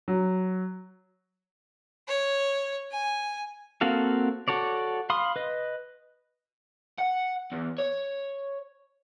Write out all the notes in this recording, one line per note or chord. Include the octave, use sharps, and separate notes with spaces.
F#3
C#5
G#5
A#3 C4 F#4 A4 F5
F#4 A4 C#5 D5
F5 B5 C6 D#6
B4 D#5
F#5
E2
C#5